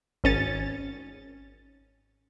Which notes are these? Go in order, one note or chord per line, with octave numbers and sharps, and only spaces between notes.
G#1 C#4 A6